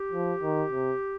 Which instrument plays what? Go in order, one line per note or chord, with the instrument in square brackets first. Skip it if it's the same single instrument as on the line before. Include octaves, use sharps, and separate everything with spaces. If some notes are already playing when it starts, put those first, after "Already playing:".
Already playing: [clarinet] G4
[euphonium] F3
D#3
C3